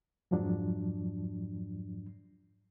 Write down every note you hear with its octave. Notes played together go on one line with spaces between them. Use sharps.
F2 G#2 F3 F#3 D4